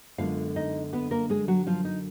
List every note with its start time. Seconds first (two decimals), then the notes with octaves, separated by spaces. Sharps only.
0.18 F#2 D3 G#3 B3 F4 F5
0.56 D#4 D#5
0.93 B3 B4
1.11 A#3 A#4
1.30 G#3 G#4
1.48 F#3 F#4
1.67 F3 F4
1.85 D#4